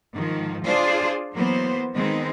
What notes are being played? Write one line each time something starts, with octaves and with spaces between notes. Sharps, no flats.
G#2 D#3 F3
D4 F4 G#4 C5 D5
E3 F#3 A#3 B3 C5
D#3 G#3 B3 C4 D#4